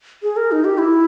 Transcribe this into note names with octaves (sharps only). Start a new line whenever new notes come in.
G#4
A#4
D#4
G4
E4